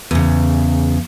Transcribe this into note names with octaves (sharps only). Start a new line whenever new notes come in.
E2 C#3